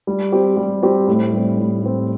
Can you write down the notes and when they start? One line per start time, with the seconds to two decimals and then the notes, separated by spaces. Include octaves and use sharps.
0.07 G3
0.32 C4 G4
0.57 G3
0.83 C4 G4
1.07 A2
1.33 G3 C4
1.58 A2
1.83 G3 C4